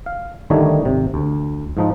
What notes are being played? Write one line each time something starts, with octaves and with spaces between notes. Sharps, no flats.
F5
D3 D#3 G3 A3 D#4 C#5
G#1 C3
D2
G#2 F3 D#4